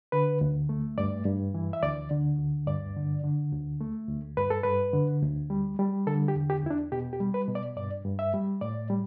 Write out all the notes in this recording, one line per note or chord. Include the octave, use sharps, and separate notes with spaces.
D3 B4
D2
A3
G2 D5
G2
E3
E5
D2 D5
D3
D2
G2 D5
D3
D3
D2
A3
D2
G2 B4
A4
G2 B4
D3
D2
G3
G3
D3 A4
G4
E2
G4
E2 E4
D4
B2 G4
G4
G3
B4
B2
D5
G2 D5
G2
E5
G3
A2 D5
G3